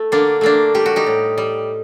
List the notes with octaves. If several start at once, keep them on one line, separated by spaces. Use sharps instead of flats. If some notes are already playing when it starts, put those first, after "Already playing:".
Already playing: A3
D3 A#3 D4
A3 A#3 D4
G3 G4
F#4
D#4 G4
A2
G3